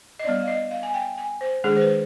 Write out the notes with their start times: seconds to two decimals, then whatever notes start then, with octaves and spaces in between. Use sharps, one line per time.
0.19 D#5
0.24 G3 B3 D4 D5
0.41 F5
0.48 D#5
0.71 F5
0.83 G#5
0.94 G5
1.17 G#5
1.41 C5
1.64 D#3 G#3 D4 G#4
1.77 C5
1.81 B4